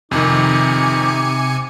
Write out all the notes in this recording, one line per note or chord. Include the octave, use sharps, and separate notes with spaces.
F2 C3 D#3 D#4 G#5 D6 C#7